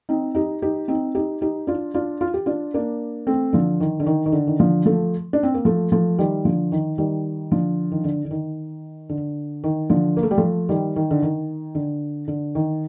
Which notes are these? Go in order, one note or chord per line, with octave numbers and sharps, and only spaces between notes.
C4 D#4
D#4 G4
D#4 G4
C4 D#4
D#4 G4
D#4 G4
D4 F4
D4 F4
F4
G4
D4 F4
A#3 D4
A3 C4
D3 F3
D#3
D3
D#3
D#3
D3
D#3
D3 F3
F3 A3
D4
C4
A#3
F3 A3
F3 A3
D#3 G3
D3 F3
D#3
D#3 G3
D3 F3
D#3
D3
D3
D#3
D3
D#3
D3 F3
A#3
A3
G3
F3 A3
D#3 G3
D#3
D3
D#3
D3
D3
D#3